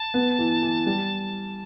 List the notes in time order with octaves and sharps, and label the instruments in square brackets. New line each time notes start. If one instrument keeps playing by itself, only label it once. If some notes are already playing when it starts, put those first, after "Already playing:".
Already playing: [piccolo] A5
[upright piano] B3
E3
E3
G3